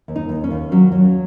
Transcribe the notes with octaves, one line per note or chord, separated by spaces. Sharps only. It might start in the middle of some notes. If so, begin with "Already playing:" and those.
D#2
D#4
D#2
C#4
D#2
F#3 C#4
F#3